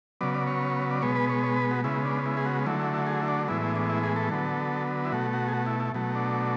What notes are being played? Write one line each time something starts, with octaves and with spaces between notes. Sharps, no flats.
C#3 F#3 B3 D5
D5
C#5
D5
B2 G#3 B3 C#5
B4
C#5
C#5
B4
F#4
C#3 G#3 B3 E4
D4
E4
G#4
F#4
D3 F#3 A3 E4
E4
E4
G#4
E4
D4
A2 E3 G#3 B3 E4
E4
D4
E4
G#4
A4
D3 F#3 B3
E4
B2 A3 F#4
F#4
G#4
F#4
E4
E4
B2 F#3 A3
D4